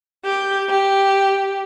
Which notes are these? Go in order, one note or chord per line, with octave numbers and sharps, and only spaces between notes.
G4 G6
G4